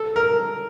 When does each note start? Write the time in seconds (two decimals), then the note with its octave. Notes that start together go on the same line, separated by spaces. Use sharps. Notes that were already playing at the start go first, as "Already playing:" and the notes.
Already playing: A4
0.16 A#4